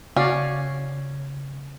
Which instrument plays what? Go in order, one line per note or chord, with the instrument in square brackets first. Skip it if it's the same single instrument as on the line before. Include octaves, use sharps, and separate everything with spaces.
[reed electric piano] C#3 [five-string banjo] C#4 [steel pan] F#4 D5 F5